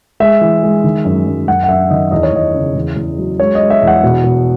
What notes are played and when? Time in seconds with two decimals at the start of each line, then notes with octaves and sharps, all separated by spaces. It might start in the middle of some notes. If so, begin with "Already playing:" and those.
0.20 G#3 E5
0.41 E3
0.63 G#3
0.84 D#3
1.05 F#2
1.26 F#2
1.48 F#2 F#5
1.64 F#5
1.69 F#2 E5
1.90 D#3 D#5
2.11 E2 D#5
2.23 C#5
2.32 E2 D#5
2.54 C#3
2.75 E2
2.96 E2
3.18 F#3
3.39 G#3 C#5
3.55 G#3 D#5
3.70 E5
3.82 E2
3.87 F#5
4.03 B2
4.24 B2